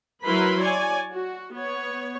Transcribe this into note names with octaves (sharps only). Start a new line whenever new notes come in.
F#3 E4 A#4 B4 B5 C6
C#5 D5 G#5
F#4
B3 C#5